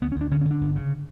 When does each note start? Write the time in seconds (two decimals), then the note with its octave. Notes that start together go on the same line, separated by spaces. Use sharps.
0.02 D2 B3
0.12 C#4
0.16 D2
0.21 D4
0.31 D3 C#4
0.41 D3 C#4
0.51 D4
0.61 G1
0.76 C#3